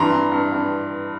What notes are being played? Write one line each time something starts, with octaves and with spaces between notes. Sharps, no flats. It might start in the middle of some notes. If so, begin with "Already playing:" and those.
Already playing: G2 E3 A#5 C6
G2
G2
G2